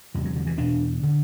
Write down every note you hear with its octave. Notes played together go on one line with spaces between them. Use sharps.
E2 C3 F#3
F#3
D3
E3
E2 B2 D4
D3